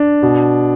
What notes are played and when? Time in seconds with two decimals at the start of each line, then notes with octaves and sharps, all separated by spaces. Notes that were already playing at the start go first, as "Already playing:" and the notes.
Already playing: D4
0.23 B2